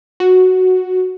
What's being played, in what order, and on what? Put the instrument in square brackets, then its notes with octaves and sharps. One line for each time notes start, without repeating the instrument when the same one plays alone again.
[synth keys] F#4